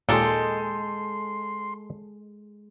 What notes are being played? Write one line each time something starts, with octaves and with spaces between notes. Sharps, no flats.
D#2 A#2 G#3 A4 G5 C6